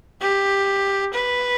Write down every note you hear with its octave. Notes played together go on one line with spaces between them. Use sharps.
G4
B4